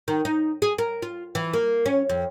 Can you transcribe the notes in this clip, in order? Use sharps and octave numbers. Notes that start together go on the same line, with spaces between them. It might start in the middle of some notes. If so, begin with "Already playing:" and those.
D#3
D#4
G#4
A#4
F4
E3
A#3
C#4
F2